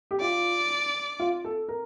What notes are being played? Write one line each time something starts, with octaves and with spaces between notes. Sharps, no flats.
G4
F4 D5
F4
A4
A#4